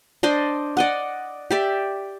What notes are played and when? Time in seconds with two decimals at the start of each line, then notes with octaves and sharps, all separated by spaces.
0.23 D4 C5 D5 D#5
0.77 D5 D#5 F#5
1.51 G4 D5 E5